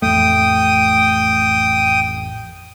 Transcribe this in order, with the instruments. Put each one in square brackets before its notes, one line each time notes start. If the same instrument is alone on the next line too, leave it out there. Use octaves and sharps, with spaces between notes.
[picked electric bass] A1 F2 A3 [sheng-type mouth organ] G5 D#6